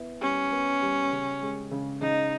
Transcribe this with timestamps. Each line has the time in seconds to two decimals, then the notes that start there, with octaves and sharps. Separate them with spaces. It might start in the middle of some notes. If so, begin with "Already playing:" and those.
Already playing: B3 E4
0.21 G3 C#4
0.52 B3
0.82 G3
1.12 C#3
1.42 G#3
1.71 C#3
2.01 C#3 D#4